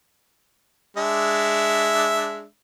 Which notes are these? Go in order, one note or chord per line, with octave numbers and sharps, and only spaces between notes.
G#3 D4 E5